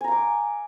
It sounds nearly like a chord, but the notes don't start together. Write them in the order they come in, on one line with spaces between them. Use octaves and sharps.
G#5 A#5 F5 D6